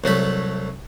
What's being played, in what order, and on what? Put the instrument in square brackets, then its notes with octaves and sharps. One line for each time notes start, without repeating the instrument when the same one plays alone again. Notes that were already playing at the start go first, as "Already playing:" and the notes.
[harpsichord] C2 F#3 A3 B5